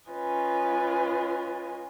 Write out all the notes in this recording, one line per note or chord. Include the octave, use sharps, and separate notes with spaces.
C#4 F4 B4 D#5 G#5